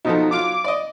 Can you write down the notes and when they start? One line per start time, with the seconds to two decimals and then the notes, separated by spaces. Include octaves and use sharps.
0.05 B2 F3 D#4 A4
0.31 F#3 F4 D6
0.64 D5 D#5